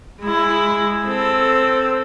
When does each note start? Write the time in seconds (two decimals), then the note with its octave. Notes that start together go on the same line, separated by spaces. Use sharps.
0.21 G#3 E4
1.04 C4 A4